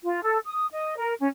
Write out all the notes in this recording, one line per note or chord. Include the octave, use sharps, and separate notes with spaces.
F4
A4
D#6
D#5
A#4
C#4